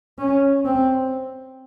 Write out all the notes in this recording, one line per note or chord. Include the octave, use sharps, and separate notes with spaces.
C#4
C4